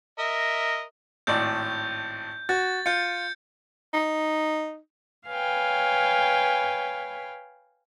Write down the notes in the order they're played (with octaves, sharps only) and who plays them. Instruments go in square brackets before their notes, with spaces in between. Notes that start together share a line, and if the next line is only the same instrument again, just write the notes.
[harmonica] A#4 D#5 E5
[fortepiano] G#1 A2 D5 [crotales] G6
[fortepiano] F#4 [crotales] A6
[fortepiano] F4 [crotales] G6 C#7
[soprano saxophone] D#4
[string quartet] B4 C#5 F5 G5 G#5